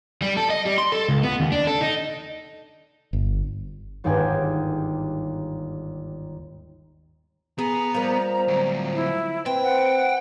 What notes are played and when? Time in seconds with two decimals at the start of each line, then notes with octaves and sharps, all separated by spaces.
0.22 G3
0.37 A4
0.50 D#5
0.65 G3
0.78 C6
0.92 A4
1.09 C#2
1.23 B3
1.40 D#2
1.52 D4
1.67 A4
1.81 D#4
3.13 G1
4.04 G1 D#2 G#2 D5 G5 G#5
7.59 B3 G#4 A#5
7.94 F3 G3 A#3
8.48 D2 F#3
8.95 E4
9.46 C4 B4 G5
9.63 F#5